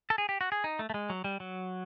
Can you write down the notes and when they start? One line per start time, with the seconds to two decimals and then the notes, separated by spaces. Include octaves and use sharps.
0.10 A4
0.18 G#4
0.29 G4
0.41 F#4
0.52 G#4
0.64 D#4
0.79 A3
0.90 A3
0.94 G#3
1.10 F#3
1.24 G3
1.40 F#3